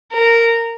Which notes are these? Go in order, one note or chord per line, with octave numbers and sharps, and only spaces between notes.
A#4